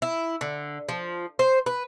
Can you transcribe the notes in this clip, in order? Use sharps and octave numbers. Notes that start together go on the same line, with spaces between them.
E4
D3
F3
C5
B4